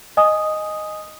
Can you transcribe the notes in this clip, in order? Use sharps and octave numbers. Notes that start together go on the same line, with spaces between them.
D#5 G#5 D#6